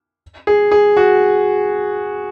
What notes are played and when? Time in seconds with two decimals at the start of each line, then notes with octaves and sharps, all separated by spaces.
0.47 G#4
0.72 G#4
0.97 F#4